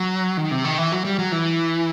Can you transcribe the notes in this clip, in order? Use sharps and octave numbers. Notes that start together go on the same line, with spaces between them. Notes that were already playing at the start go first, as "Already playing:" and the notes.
Already playing: F#3
D#3
C3
D#3
E3
F#3
G3
F#3
E3